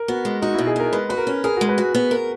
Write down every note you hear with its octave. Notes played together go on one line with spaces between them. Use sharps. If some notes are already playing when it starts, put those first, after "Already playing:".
Already playing: A#4
B3 F#4
G#3
D#4 F#4
E4
B2
G#4
B3 A#4
G#3 B4
F#4 B4
A#4
C#4
G#4 A#4
F#4
G#3
B4
F#4
B3
A#4